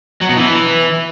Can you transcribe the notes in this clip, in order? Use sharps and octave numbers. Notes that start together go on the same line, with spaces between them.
F#3
B2
E3